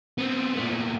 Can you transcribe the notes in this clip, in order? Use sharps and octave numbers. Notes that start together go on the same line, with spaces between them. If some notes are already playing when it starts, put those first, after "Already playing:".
B3 C4
A#2 A3